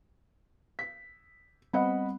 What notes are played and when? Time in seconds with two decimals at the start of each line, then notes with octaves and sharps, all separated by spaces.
0.79 B6
1.73 G3 B3 C4 D#5 F#5 B5